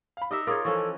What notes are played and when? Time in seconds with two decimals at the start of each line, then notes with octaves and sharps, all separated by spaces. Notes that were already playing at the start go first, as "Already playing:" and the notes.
0.17 F5 B5
0.31 D#4 G4 A#4 E5 D6
0.47 F4 G#4 A#4 C#5 F5 D6 D#6
0.65 E3 F3 C#4 A4 C#6